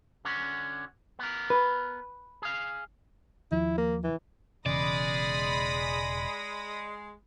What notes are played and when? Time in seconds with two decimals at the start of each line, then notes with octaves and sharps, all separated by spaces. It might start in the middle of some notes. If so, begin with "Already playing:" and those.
0.25 D3 C#4 F#4
1.19 B3 A#4
1.50 B4
2.42 G#4 F5
3.52 D#2 F3 E4
3.78 A#3
4.04 E3
4.66 E1 E2 C#3 G#3 D5 B5 D#6 A#6